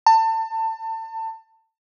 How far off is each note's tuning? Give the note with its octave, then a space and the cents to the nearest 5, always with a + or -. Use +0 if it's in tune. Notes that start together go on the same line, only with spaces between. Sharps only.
A5 +30